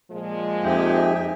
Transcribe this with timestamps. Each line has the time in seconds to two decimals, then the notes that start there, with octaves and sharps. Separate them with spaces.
0.11 A#2 F3 G#3
0.64 F2 D#4 G4 E5 G5 G#5